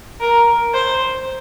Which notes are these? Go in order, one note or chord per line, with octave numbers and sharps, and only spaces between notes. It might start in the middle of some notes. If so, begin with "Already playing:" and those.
A#4
C5